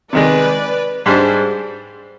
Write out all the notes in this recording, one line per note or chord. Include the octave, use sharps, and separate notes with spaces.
C3 D#3 G#3 B4 D5
G#2 G3 D4 G#4 C5